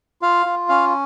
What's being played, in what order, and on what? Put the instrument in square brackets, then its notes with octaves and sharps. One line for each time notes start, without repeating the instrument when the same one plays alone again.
[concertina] F4 F5
F4
C#4 F5